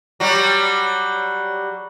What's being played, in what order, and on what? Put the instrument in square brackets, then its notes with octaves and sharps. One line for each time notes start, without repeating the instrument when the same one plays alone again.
[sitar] F#3 G3